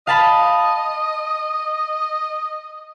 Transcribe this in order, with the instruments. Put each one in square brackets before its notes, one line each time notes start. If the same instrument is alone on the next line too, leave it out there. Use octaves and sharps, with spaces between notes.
[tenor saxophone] D#5 [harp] F5 A5 B5